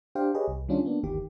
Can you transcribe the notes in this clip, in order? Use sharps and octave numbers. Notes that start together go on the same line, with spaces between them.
D4 G4 C5 F5 G5
G4 G#4 B4 C#5 D#5
C2
D#3 G3 C#4 D4 F4
A#3 B3 D4
G1 D2 D#3 G4